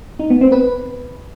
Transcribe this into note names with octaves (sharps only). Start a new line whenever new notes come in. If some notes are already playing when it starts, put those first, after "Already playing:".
D#4
B3
C4
B4